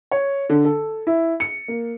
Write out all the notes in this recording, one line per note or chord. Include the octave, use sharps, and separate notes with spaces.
C#5
D3
A4
E4
C#7
A#3